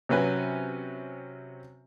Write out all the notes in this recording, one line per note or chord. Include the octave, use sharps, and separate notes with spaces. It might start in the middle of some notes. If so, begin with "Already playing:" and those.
C3 F#3 C#4 B4 G#5